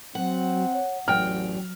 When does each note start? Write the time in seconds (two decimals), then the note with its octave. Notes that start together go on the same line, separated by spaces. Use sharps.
0.15 F#3 C4 F#5
0.73 C#5
1.08 A1 E2 F#3 G5 F6